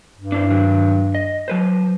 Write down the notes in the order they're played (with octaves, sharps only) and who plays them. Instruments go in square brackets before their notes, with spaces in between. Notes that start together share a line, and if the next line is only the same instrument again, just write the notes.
[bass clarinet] G2
[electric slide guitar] D4 E4 C5
D#3 F#3 D4
D#5
F#3 B4 C5